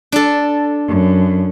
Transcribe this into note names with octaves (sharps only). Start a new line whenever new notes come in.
D4 A4
F#2